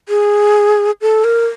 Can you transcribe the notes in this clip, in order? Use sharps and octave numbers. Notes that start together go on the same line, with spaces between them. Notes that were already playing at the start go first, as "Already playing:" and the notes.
G#4
A4
A#4